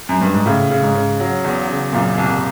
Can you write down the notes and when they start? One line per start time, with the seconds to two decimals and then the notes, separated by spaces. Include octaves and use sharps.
0.09 F#2
0.21 G2
0.34 G#2
0.46 A2 C#3
0.71 C#3
0.83 G#2
0.95 C#3
1.20 F#3
1.45 E2
1.69 C#3
1.93 F#2 A#2
2.18 C2